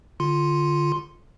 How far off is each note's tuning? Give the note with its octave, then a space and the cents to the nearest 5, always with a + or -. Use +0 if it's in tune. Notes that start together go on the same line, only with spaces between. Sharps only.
D3 +0 F4 -5 C6 +0